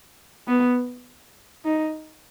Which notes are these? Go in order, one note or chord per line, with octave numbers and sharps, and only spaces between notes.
B3
D#4